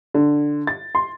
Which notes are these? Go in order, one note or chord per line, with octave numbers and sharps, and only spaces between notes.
D3
A6
C6